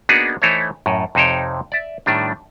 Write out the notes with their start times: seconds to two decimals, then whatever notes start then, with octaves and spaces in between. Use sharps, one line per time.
0.09 A#3 B3 D4 D#4 F#4 G#4
0.42 E3 A3 D#4 E4 C5 C#5
0.86 F#2 A2
1.15 F2 C3 D#4 C5 C#5 G5
1.72 D5 E5
2.06 A2 D#3 G3 D4